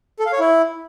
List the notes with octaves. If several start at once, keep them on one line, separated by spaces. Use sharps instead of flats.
A4
F5
C#5
E4